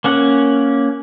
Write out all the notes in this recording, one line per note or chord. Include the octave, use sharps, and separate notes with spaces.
A#3 C#4 F#5